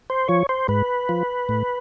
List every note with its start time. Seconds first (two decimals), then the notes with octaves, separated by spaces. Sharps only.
0.10 C5
0.28 F3 C#5
0.49 C5
0.68 G#2 B4
1.09 F3
1.49 A2